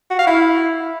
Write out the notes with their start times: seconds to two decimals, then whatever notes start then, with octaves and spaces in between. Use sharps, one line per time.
0.11 F#4
0.19 F5
0.27 E4